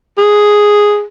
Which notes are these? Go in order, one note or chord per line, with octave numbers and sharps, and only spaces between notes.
G#4